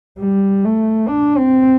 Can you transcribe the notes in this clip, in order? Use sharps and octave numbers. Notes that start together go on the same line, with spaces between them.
G3
A3
D4
C4